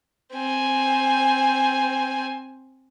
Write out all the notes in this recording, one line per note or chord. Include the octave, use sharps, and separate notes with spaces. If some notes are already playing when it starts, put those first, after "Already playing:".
C4 G#5